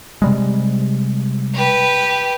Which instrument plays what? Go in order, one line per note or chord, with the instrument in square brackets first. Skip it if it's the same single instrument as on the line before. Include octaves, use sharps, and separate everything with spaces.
[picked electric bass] C3 G3 G#3
[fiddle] G4 B4